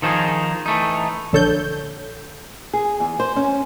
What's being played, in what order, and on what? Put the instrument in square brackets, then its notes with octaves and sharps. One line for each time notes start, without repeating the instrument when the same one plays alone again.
[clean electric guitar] D#3 F3 D#4 G4 G#4
E3 A3 D#4
[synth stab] A#1 D3 A4 C#5 G6
[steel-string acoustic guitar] G#4
E2
C5
C#4